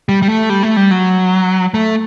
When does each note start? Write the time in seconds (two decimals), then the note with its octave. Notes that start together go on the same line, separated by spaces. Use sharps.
0.09 G3
0.22 G3
0.29 A3
0.50 G3
0.63 A3
0.77 G3
0.91 F#3
1.74 A3